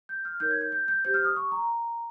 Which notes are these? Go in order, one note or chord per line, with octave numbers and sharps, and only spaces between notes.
G6
F6
D#4 A#4 C#5 G6
G#6
G6
G6
G6
G4 C5 G6
F6
D#6
C#6
A#5